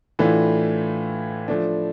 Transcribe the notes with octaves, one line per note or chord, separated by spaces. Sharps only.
A2 E3 A3 D4 F4
F3 A3 D4